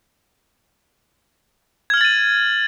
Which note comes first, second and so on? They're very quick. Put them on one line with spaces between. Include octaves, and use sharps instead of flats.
G#6 F6 F#7 A6 D#7